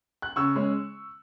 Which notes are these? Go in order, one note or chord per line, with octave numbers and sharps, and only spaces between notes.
F#6
C#3 C#6 E6
G#3 C#4